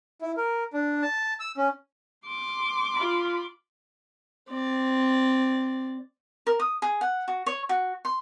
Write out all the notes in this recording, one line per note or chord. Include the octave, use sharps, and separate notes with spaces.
E4
A#4
D4
A5
E6
C#4
C6 D6
F4 B5
C4 D5
A#4
D#6
G#4
F#5
F#4
C#5
F#4
C6